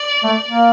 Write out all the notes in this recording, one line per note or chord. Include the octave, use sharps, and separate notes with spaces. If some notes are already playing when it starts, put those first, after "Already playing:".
Already playing: D5
A3
A#3